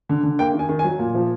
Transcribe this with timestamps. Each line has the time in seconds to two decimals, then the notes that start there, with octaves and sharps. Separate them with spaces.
0.09 D3
0.23 D3
0.39 A#3 G5
0.54 D#3
0.59 G#5
0.69 D#3
0.79 F#3 G#5
0.99 A#2
1.14 F3